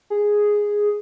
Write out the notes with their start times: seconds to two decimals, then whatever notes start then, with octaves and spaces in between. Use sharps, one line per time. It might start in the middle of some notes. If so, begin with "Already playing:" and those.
0.10 G#4